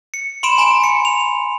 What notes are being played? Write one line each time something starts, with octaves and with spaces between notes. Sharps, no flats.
C#7
B5 C6 D7 E7
G#5 A#5 B5 E7
C#7
F7